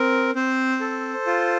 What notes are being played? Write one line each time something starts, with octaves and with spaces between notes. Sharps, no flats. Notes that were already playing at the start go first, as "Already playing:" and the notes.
Already playing: C4 A#4
C4 C5
A4
F4